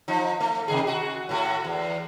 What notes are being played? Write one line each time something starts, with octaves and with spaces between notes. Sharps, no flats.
F3 D#4
A3
C3 D#3 G#4
F#4
A2 A3 F#4
E2